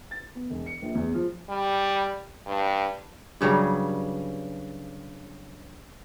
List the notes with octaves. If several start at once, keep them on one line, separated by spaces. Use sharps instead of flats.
A6
B3
E1
C#7
A#1
E2
F3
G3
G2
G2 C#3 F#3 G3